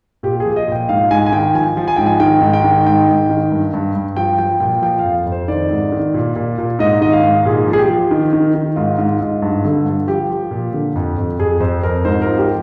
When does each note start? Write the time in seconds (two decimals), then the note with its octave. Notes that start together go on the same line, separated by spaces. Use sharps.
0.23 A#2 G4
0.40 G#4
0.45 F3
0.56 D#5
0.68 A#2 G5
0.89 G#2 F5
1.11 G#2 G#5
1.26 G#5
1.32 D#3 G5
1.55 F3 G#5
1.77 F3
1.88 G#5
1.96 G#2 G5
2.06 G#5
2.20 D#3 G5
2.41 G#2
2.53 G5
2.64 D#3
2.86 G#2 G5
3.08 G#2
3.30 D#3
3.52 G2
3.73 G2
3.95 G2
4.16 F3 G5
4.38 F3 G5
4.60 A#2 G5
4.82 F3 G5
4.99 F5
5.04 F2
5.26 F2
5.32 C5
5.48 D#3 D5
5.71 G#2
5.92 D#3
6.14 A#2
6.36 A#2
6.58 A#2
6.79 G#2 D#5
7.01 D#3 D#5
7.13 F5
7.24 G#2
7.45 A#2 G#4
7.67 F3
7.73 G#4
7.78 G4
7.89 F3
8.11 D#3
8.33 D#3
8.55 D#3
8.76 G#2 F4
8.98 G#2
9.21 G#2
9.42 G2
9.65 D3
9.86 G2
10.07 F3 G4
10.30 F3
10.51 A#2
10.73 D3
10.96 F2
11.18 F2
11.39 F2 G#4
11.60 F2 C5
11.83 F2 A#4
12.05 G#2 C5
12.22 F3 A#4
12.38 G4